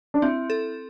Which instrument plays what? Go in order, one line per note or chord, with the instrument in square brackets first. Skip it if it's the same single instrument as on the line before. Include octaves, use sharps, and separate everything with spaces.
[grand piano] D4
[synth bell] C4 [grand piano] E4
[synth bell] A4